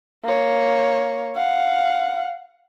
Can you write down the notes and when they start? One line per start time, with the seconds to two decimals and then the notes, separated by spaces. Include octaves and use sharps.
0.24 A#3 C#5
1.36 F5 F#5